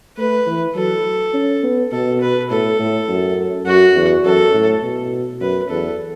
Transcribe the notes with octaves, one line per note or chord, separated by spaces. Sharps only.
A3 B4
E3
F#3 A4
C#4
B3
B2 A4
B4
A2 A4
A2
F#2
F#2 F#4
E2
F#2 A4
A2
B2
F#2 B4
E2 A4